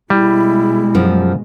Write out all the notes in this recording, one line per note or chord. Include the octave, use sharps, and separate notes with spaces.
B2 G3 G#3 E4
F#2 F3